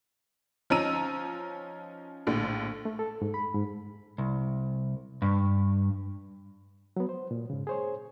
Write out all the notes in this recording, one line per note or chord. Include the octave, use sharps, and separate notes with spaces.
F3 C#4 D#4 A#5 E6 D#7
A#1 A2 D3
A3
A4
G#2
B5
G#2
C2
G2
F#3 B3
C5
A#2
G#2 C#3
G#4 C5 C#5